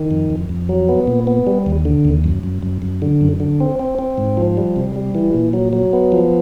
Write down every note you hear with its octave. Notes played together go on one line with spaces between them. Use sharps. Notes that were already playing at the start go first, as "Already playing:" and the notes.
Already playing: D#3
F2
F2
F2
F#3
B3
A#2
B3
G3
D#2
D3
D#2
F#2
F#2
F#2
F#2
D3
F#2
D3
C4
C4
C4
G#2
F3
G3
C3
G3
E3
A#2
F#3
F#3
B3
F3